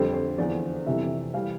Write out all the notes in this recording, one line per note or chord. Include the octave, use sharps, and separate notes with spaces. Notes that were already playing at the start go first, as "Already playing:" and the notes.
Already playing: F2 D3 G3 C5
C5
E2 D3 F3 D5
F2 C3 E3 G3 E5
E3 G3 F5